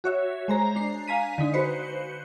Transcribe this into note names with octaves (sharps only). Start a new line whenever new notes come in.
F#4 C#5 E5
G#3 C5 A#5
D4 C7
F5 G#5 A#5 B6 D#7
D3 D#4
F#4 B4 C5 C#7